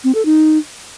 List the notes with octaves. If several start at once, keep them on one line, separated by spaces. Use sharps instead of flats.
C4
A4
D#4